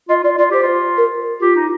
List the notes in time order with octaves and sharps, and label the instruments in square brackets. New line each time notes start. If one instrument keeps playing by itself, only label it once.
[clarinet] F4 [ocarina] D#5
[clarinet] F4 [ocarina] D5
[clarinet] F4 [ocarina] D5
[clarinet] G4 [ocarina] C5
[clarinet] F4
[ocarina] A#4
[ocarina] F4 [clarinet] G4
[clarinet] D#4